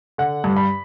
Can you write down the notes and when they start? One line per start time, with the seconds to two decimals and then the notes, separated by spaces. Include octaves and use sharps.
0.18 D3 F#5
0.44 G2
0.56 B5